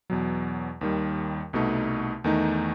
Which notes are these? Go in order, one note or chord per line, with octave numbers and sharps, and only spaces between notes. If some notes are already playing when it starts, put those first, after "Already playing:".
E2 B2 F#3
D#2 D#3 G3
C2 B2 A3 D#4
E2 D#3 A3 D#4